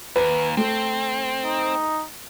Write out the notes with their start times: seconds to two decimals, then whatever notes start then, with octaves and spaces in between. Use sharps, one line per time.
0.16 D#2 B4
0.57 A3 C4
1.45 D#4